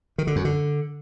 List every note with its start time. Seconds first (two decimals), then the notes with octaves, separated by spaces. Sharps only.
0.18 D#3
0.27 D3
0.36 F#2
0.45 D3